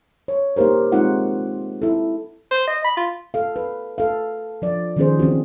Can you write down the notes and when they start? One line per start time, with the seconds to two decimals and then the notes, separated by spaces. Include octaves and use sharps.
0.28 C#5
0.56 A#3 D#4 G4 A#4 C5
0.92 G#3 C4 D#4 F4 F#5
1.82 E4 A4
2.51 C5
2.67 D#5
2.84 B5
2.97 F4
3.34 A4 F5
3.56 B4
3.98 A4 F5
4.62 F3 D5
4.97 D#3 F3 B3 C#4 G#4 C5
5.19 E3 C4 C#4 F#4